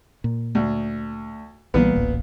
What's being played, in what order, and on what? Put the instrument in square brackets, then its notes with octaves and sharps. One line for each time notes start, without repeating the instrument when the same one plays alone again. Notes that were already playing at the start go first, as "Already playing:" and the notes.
[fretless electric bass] A#2
[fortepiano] D2
[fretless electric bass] B1 E3 G3 [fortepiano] A#2 B3
[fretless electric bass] D1 A1